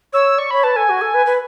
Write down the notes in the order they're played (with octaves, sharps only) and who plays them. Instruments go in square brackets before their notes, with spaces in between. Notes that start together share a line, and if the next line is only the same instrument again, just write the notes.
[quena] C#5 [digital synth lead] E6
[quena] D5 [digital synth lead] C#6
[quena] C#5 [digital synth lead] B5
[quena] B4 [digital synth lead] A5
[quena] A4 [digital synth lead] G#5
[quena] F#4
A4
B4
B4